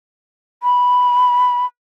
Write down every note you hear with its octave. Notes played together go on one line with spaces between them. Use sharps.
B5